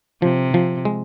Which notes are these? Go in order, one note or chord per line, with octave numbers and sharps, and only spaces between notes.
C3 F3
F3
G#3